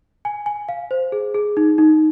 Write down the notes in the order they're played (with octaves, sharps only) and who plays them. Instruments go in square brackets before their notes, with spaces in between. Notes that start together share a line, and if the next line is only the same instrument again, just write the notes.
[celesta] G#5
G#5
F5
C5
G#4
G#4
D#4
D#4